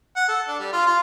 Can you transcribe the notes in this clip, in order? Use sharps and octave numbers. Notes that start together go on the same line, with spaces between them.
F#5
A4
D4
G3
F4
F4